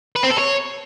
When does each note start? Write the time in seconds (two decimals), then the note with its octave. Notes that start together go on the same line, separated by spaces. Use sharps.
0.16 B4
0.24 C4
0.31 A4
0.39 C#5